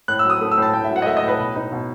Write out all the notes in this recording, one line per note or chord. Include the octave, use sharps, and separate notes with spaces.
A2 F#6
E6
F#3 D#6
A3
E6
A2 A5
A2 G5
E5
F#3
F#5
D#5
A3 E5
D#5
A2
B4
B2
D#4
B2